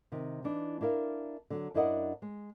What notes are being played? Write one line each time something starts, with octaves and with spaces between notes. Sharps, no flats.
C3 D#3
E3 D4 D#4
D4 E4 A#4 F5
D3 F#3
F#2 D4 E4 A#4 D#5 F#5
G#3